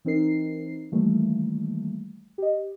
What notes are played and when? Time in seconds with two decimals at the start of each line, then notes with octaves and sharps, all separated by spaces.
0.05 E3 C4 D#4 A#4 C7
0.92 D#3 E3 G3 A3 A#3
2.38 G4 D#5